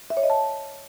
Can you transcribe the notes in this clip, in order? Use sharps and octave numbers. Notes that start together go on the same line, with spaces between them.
E5
C#5
D#5
A5